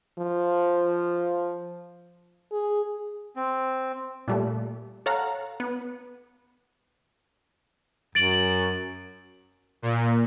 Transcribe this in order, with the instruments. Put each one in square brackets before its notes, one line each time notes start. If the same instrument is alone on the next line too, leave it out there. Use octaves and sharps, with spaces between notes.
[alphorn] F3
G#4
[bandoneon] C4
[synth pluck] A#2 G3 A3
A4 C#5 F5 F#5 A#5
B3
[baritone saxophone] F#2 [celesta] A6 D7 F#7
[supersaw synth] A#2